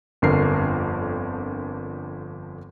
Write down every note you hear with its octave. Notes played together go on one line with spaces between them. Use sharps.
G1 F2 D3 F3 A#4 C7